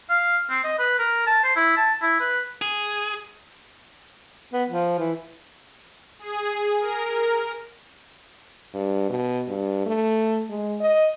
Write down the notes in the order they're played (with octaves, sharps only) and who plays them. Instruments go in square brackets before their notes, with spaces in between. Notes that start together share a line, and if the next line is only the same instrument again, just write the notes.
[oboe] F5
C4
D#5
B4
A#4
A5
C5
E4
A5
E4
B4
[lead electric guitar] G#4
[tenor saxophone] B3
F3
E3
[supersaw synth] G#4
A#4
[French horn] G2
B2
G2
A3
G#3
D#5